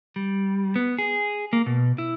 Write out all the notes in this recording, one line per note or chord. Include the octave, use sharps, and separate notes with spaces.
G3
B3
G#4
A#3
B2
E4